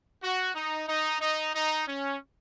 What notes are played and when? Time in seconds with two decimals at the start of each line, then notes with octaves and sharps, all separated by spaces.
0.22 F#4
0.55 D#4
0.87 D#4
1.20 D#4
1.54 D#4
1.87 C#4